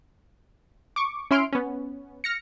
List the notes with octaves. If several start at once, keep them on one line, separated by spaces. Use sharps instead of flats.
C#6 D6
C#4 E4 C6 F6 D7
B3 C#4
F6 A#6 C#7